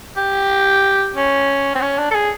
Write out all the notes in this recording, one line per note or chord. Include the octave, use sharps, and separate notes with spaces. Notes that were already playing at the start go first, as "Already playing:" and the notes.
G4
C#4
C4
C#4
D4
A4
G#4